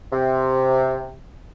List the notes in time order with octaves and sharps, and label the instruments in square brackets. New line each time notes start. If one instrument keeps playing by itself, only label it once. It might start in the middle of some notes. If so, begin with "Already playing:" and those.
[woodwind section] C3